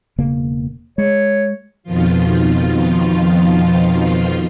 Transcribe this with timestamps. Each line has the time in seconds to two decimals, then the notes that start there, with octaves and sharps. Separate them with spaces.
0.18 E1 C#3 A#3
0.98 G#3 C#5
1.83 F2 B2 D#3 F3 F4